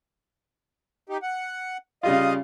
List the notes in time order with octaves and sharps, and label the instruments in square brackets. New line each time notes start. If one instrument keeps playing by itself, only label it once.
[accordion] D#4 G4
F#5
[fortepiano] C#3 G3 F4 [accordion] D#5 F5